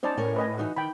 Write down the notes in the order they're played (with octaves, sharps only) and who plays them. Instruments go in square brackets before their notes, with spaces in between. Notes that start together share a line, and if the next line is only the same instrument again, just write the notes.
[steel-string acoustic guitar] C#4 D#4 [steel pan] C5 D5 A5
[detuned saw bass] A2 [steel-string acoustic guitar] C#4 A#4 C#5
[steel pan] B4 D#5 G#5
[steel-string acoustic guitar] E3 D#4 F#4
[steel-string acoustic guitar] D#3 [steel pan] G5 B5